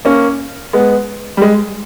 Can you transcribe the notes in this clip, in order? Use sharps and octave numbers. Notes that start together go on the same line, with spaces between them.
A#3 C#4
G#3 B3
G3
G#3